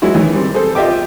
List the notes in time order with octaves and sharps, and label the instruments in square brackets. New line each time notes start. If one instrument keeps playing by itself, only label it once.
[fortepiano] F#3 G#3 E4 F#4
D#3 E3
G3 C4
G#4 A4 C5
F4 G4 D#5 E5 G5 D6